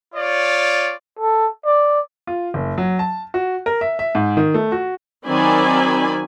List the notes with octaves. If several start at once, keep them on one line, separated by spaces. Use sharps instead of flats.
F4 C#5 D5
A4
D5
F4
F#1
F#3
A5
F#4
A#4
E5
E5
G#2
D#3
A3
F#4
D#3 F#3 C4 D5 G#5 B5